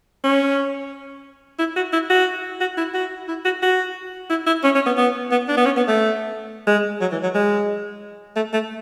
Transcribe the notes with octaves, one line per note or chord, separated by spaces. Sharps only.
C#4
E4
F#4
E4
F#4
F#4
E4
F#4
E4
F#4
F#4
E4
E4
C#4
C#4
B3
B3
B3
D4
B3
C#4
B3
A3
G#3
F#3
E3
F#3
G#3
A3
A3